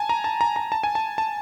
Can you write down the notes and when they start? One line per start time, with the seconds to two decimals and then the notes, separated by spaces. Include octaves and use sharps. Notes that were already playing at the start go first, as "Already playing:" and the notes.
Already playing: G#5 A5
0.09 A#5
0.24 A5
0.41 A#5
0.56 A#5
0.72 A5
0.83 G#5
0.95 A5
1.18 A5